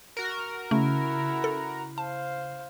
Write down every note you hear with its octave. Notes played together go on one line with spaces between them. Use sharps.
F#4 A#4
C#3 A3 E4
A4
C5 F5 A5